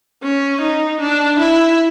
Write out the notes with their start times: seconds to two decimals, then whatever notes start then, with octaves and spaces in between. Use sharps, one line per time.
0.23 C#4
0.61 D#4
1.00 D4
1.39 E4